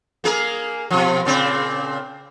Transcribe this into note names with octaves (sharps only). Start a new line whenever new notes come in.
A#3 G#4 A#4
B2 F3
A#2 C#3 C4